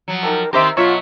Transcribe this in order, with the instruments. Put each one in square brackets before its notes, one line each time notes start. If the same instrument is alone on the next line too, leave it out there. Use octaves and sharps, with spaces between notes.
[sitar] F3 F#3
[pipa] D#4 G4 A4 [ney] A#4
[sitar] D#3 C4 G4 [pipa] A#4 C5 E5 [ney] C6
[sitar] B2 F#3 E5 [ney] F4 [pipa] C#5